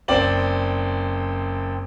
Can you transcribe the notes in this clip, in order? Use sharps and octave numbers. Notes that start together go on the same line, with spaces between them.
F#1 C4 D5 F#7